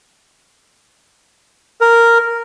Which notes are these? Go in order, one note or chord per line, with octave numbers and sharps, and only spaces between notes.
A#4